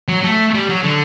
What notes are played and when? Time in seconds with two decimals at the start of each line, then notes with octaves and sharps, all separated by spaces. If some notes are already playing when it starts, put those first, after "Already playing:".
0.08 F#3
0.24 A3
0.54 G3
0.69 F#3
0.83 D3